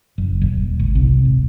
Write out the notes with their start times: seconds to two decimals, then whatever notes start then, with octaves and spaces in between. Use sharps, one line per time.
0.18 F#1
0.42 D#1
0.79 G#1
0.95 C2
1.25 D#1